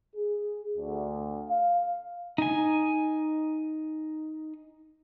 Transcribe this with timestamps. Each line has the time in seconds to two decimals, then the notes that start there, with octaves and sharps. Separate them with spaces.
0.16 G#4
0.76 D2
1.49 F5
2.38 D#4 G#5